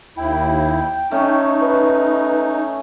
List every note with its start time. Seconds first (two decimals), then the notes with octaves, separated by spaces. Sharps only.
0.17 D#2 E4 G5
1.11 A3 C#4 D#4
1.61 B4